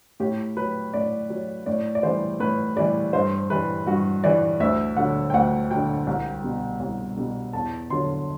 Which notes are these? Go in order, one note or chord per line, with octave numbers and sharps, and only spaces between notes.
A2 G4
F#3 B4
A2 D5
F#3
A2 D5
D5
E3 G3 C5
A2 B4
E3 G3 D5
G2 C5
E3 G3 B4
G2 F#4
E3 G3 D5
D2 E5
D3 F#3 F#5
G5
D2 F#5
D3 F#3 G5
C2
B2 G3
C2
B2 G3
E2 A5
D3 F#3 C6